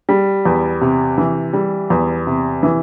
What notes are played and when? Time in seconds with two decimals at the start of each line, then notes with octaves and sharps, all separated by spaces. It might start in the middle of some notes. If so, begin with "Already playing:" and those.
0.09 G3
0.45 E2
0.81 C3
1.18 E3
1.53 G3
1.90 E2
2.27 C3
2.63 E3